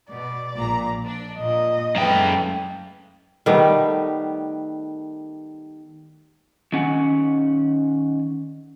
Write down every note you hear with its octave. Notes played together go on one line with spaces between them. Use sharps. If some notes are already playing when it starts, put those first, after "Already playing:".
B2 D5
A#1 A#2 A#5
D4
A#2 D#5
F#2 G#3 A3 B4 G5
D#3 G3 A3 B3
D#3 C#4 F#5